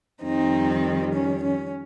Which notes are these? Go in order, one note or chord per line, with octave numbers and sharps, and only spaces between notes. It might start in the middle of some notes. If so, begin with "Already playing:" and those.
F2 D#3 G3 C4 D#4
C#4
C#4